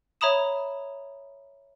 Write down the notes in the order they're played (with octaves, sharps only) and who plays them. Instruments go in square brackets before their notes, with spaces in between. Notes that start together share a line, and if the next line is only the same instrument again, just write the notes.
[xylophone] C#5 E5 A#5 B5 D#6 E7